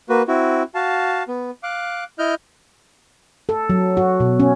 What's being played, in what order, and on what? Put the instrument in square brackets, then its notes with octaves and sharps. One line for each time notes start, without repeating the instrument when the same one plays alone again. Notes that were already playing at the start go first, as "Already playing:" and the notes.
[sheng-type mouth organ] A#3 F#4 B4
C4 E4 F#4
F#4 F5 A5
B3
F5 D6 F#6
E4 D#5 F6 G6
[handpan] A4
F#3
F#4
B2
C#4